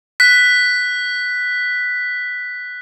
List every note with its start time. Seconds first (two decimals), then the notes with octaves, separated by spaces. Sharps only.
0.20 F#6 B6